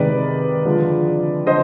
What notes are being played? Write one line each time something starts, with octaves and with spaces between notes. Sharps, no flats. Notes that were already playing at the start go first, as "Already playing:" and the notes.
Already playing: C3 D#3 G#3 B4 D5
D3 F3 G#3
D3 C5 D#5